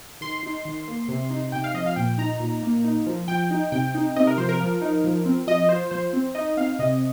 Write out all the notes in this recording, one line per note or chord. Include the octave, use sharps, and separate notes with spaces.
D#3 C6
D#4
D#3
A#3
C3
D#4
C3 G5
F5
F3 D#5
F5
A#2 G5
D#4 A#5
A#2
A#3
D#4
F3
F3 G5
D#4
C3 G5
D#4
C3 D#5
A#4
F3 C5
A#4
F3
D#4
F3
C4
F3 D#5
F4 C5
F3 C5
C4
D#4 D#5
C4 F5
C3 D#5